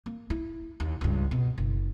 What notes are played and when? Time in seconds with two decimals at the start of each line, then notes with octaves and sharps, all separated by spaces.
0.06 A#3
0.30 E4
0.80 D#2
1.01 C#2 G2
1.31 B2
1.58 F#1